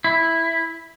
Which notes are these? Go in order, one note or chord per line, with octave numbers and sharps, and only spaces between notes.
E4